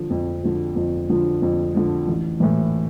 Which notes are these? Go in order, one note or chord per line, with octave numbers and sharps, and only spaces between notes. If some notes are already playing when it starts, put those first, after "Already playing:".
Already playing: D3 F3
F2
D3 F3
F2
D3 F3
F2
D3 F3
A1
A2 E3